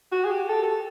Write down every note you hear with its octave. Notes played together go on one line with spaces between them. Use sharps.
F#4
G#4
G4
A4
A4